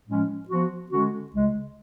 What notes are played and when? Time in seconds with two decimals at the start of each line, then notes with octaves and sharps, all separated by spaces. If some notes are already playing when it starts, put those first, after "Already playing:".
0.08 A2 F3 G#3 C#4
0.49 F3 B3 F#4
0.90 D3 G#3 C#4 F#4
1.33 C#2 C#3 G#3